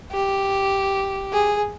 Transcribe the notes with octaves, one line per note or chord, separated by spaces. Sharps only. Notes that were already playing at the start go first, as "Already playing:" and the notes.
G4
G#4